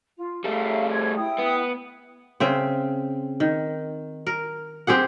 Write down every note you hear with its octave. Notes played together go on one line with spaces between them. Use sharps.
F4
G3 A3 E5 F5
C5 G#6
E4 G5 D#6
B3
C#3 C4 E5
D#3
A#4
C4 G4 G#4 F#5